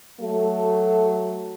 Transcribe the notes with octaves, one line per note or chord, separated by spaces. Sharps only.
F#3 A3 A4